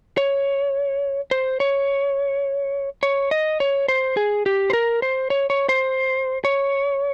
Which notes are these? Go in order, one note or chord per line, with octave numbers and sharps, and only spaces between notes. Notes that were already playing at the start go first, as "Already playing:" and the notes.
C#5
C5
C#5
C#5
D#5
C#5
C5
G#4
G4
C5
A#4
C5
C#5
C#5
C5
C#5